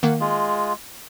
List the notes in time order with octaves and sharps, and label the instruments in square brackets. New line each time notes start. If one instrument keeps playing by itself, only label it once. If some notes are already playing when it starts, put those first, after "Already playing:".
[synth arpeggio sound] D#3 A#3 [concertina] F#5
[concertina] G#3 F4